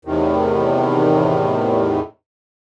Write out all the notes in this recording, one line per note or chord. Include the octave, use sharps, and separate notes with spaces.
E2 A2 C3 D#3